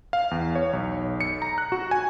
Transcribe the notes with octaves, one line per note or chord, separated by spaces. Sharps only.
F5
E2
C#5
B1
C#7
A#5
F#6
F#4
G#5